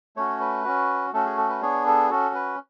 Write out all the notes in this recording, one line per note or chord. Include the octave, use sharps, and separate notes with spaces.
A3 C#4 F#4 C#5
B4
C#4 F#4
A3 C#4 F#4 A4
G#4
A4
B4
B3 D4 G#4 C#5
A4
C#4 F#4 A4
B4